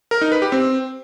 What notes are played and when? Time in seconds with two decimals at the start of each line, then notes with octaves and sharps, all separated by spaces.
0.11 A#4
0.21 D#4
0.32 B4
0.42 G4
0.52 C4